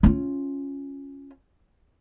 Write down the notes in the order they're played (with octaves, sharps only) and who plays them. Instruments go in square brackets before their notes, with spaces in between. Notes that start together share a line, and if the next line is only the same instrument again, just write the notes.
[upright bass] C#4 F4